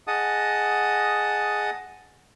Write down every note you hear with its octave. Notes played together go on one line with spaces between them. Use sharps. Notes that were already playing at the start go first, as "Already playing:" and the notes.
G#4 D#5 F#5 A5 D#6